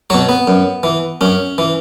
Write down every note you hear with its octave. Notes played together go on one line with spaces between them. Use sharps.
B2 F#3 C#5
B3
F#2
E3
F#2 C#4
E3